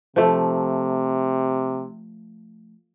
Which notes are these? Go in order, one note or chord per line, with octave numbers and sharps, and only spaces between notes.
C3 F3 A3